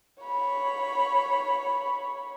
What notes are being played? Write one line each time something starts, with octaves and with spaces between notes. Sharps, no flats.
C#5 B5